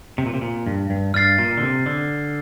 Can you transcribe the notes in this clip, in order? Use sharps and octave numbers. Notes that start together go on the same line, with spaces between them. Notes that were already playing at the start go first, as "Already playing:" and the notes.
C3
A#2
C3
A#2
G2
G2
G2 F6 A6 C7
A#2
D3
C3
D3